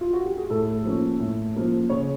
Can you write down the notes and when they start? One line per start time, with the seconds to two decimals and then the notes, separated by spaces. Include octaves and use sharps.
0.01 F4
0.13 F#4
0.26 G4
0.38 G#4
0.50 A2 A4
0.85 F3 A#3 C#4
1.20 A2
1.55 F3 A#3 C#4
1.90 C#3 C#5